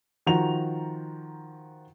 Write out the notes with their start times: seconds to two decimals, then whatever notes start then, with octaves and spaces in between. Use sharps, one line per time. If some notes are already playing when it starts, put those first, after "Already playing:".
0.26 D#3 F3 F#4 A#5 F7